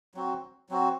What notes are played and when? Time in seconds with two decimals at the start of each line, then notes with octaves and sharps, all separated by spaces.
0.15 F#3 C4 F#4
0.69 F#3 C4 F#4